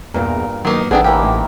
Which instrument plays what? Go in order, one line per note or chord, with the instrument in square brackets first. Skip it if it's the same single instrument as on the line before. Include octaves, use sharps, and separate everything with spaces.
[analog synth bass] E2 [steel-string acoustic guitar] G2 A#2 [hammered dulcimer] A#4
[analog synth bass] D#3 [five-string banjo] F#3 A#3 B3
[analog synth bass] A1 [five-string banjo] D#3 D4 G#4 [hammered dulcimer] A3 [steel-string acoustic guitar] B3
[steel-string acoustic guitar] D2 B4 [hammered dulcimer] D#3 E3 A#3 [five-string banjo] G4
[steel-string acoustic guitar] A2